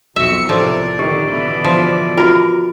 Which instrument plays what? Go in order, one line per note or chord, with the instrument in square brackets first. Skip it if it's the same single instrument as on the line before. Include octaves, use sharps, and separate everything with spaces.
[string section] B1 F2 C#7 [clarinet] F#4 [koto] E5
[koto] A2 F3 [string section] C3 A#4 [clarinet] D5
[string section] D3 D#3 [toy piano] G4
[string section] B2 D3 E3
[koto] F3
[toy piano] F4 F#4 [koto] A#4